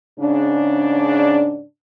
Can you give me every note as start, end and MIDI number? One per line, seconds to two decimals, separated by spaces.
0.19 1.63 44
0.19 1.63 49
0.19 1.63 62